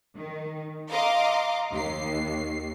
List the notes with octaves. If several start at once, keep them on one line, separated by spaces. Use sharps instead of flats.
D#3
D#5 F5 A#5 C6 D6
D#2 C7